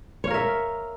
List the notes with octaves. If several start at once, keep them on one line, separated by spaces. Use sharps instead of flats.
A#4 C#5 E5 F5